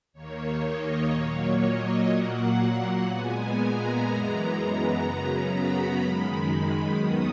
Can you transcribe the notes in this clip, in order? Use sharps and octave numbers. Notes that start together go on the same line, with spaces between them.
D#2 D#3 A#3 C#5
D#5
A#2 F#3 A#3 C#5
D#5
A#2 F#3 A#3 F#5
F#5
A#2 G#3 B3 G#5
A#5
F#2 E3 G#3 B3
F#2 C#3 F#3 B3
B5
F#2 D#3 G#3
D#2 D#3 F#3 B3 D#6